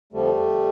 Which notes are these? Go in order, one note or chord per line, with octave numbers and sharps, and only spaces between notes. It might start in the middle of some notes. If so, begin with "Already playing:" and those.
F2 D3 F3 G3 A3